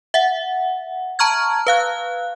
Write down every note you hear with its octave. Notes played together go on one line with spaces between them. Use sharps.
E5 F#5
A5 A#5 C#6 F6 G#6
B4 F5 F#6